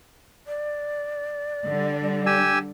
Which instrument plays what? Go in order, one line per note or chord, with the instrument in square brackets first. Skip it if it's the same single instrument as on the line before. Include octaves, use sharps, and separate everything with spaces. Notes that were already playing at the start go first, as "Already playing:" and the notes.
[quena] D5
[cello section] D3 G3
[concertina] G4 G#5 E6